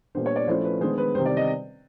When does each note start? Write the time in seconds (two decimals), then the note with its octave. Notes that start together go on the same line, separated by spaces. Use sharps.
0.15 A#2 G3 B3 D4 C5
0.26 C#5
0.36 D5
0.47 F3 A3 C#4 E4 C5
0.65 B4
0.81 D#3 G#3 B3 D4 C5
0.98 B4
1.15 C3 D#3 G3 C5
1.26 D5
1.37 D#5